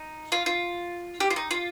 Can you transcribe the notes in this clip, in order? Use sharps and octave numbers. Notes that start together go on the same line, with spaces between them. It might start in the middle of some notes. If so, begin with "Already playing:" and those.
Already playing: D#4
F4
F4
G4
F4
D#4
F4